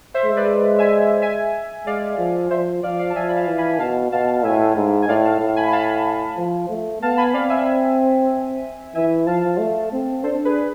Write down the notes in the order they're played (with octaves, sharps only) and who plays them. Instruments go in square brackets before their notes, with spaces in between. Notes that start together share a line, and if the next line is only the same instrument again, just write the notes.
[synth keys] C5 E5
[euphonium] G#3
[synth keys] B4 D5
E5 G#5
E5 G#5
[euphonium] G#3 [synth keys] D5 F5
[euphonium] F3
[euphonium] F3 [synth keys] C5 E5
[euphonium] F3 [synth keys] D5 F5
[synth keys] D5 F5
A5
[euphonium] F3 [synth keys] E5 G#5
[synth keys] B5
F5 A5
[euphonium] E3
[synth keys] G#5 B5
[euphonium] B2 [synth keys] F5 A5
[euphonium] B2 [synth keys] F5 A5
[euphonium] A2 [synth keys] E5 G#5
[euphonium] G#2
[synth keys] G#5
[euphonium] A2 [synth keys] D5 F5
[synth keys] F5 A5
[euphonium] A2
[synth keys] G#5 B5
B5
F5 A5
[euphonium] F3
A3
[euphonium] B3 [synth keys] F5 A5
[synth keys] G#5 B5
[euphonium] C4 [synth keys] D5 F5
[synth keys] E5 G#5
[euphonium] E3 [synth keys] E5 G#5
[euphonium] F3 [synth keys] F5 A5
[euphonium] A3
C4
[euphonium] D4 [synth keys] A4 C5
[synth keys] G#4 B4